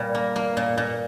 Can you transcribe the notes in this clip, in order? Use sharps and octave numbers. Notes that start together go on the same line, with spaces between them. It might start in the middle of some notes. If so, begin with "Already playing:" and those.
Already playing: A#2 G3
A#3
A#3
A#2
A#2